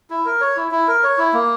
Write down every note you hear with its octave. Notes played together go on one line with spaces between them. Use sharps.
E4
A#4
C#5
E4
E4
A#4
C#5
E4
A#3